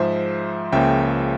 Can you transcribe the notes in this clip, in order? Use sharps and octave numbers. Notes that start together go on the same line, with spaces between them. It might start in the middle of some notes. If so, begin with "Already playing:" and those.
Already playing: G#2 F3 G#3 C5 E5
C#2 C#3 F3 A#3 E5 G5